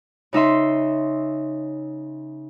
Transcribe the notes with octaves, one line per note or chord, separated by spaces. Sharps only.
C#3 D#4 E5 C6